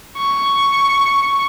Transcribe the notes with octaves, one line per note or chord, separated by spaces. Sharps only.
C#6